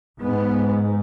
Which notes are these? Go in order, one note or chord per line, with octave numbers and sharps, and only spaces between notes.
G#2 B3